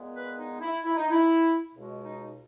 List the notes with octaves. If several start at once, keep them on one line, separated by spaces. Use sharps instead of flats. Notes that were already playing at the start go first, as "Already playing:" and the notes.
Already playing: A#2 G#3 B3
B4
D#4
E4
E4
D#4
E4
C#2 B2 G#3
D#4